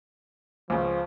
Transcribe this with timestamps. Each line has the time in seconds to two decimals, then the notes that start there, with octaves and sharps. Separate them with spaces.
0.70 C#2 C#3 F3